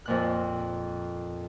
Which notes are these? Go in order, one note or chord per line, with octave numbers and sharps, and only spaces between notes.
F2 A#2 F#6